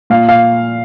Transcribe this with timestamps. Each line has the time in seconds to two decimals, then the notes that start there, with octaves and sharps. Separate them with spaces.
0.10 A#2 F5
0.29 F5